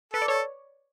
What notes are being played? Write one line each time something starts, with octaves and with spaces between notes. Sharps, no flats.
A4 B4
D5
A4 C#5